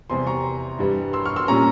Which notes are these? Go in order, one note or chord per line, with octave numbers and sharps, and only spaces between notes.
E2 C3 G3 C4 G#5 C6
A#5 C#6
G2 E3 G3
C6 E6
C#6 F6
C6 E6
A#2 G3 C#4 A#5 C#6